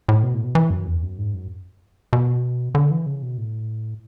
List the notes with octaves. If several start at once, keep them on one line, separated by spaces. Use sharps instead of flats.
A2
B2
A2
B2
E3
F#2
E2
F#2
G#2
F#2
B2
D3
E3
C#3
B2
A2